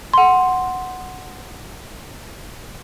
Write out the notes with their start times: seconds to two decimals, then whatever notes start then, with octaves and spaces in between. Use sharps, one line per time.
0.14 F#5 C6